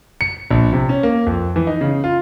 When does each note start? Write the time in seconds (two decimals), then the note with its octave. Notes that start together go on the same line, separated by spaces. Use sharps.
0.21 C#7
0.51 A#1
0.73 C3
0.89 C#4
1.03 A#3
1.26 F2
1.56 E3
1.67 D#4
1.81 C#3
2.04 F4